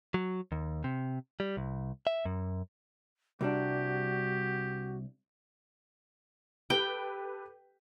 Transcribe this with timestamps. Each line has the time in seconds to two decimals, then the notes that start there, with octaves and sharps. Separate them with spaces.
0.14 F#3
0.52 D#2
0.84 C3
1.40 G3
1.57 C2
2.07 E5
2.25 F#2
3.41 C2 G3 D4 F#4 G4
6.70 G4 A4 B4 G5